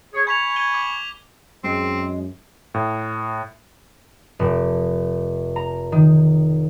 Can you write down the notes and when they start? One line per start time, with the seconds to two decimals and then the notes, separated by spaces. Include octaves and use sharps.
0.13 G#4 C#5
0.27 G#5 B5 C#6 G#6 B6 F7
0.56 G#6 D#7 G7
0.74 D6
1.64 F#2 G#3 C4
2.74 A2
4.39 F1
5.56 A#5
5.92 D#3